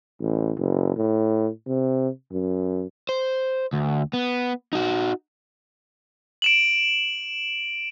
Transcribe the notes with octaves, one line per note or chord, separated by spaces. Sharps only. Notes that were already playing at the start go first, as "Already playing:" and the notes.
A1
F#1
A2
C3
F#2
C5
D2
B3
D#4 F#4
D7 E7 F#7